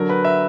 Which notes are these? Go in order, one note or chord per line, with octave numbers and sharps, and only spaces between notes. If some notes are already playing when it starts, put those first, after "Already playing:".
Already playing: D3 F#3 A#4
B4
E5